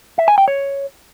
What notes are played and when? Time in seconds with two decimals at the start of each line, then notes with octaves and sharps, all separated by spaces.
0.18 E5
0.28 G#5
0.38 G5
0.48 C#5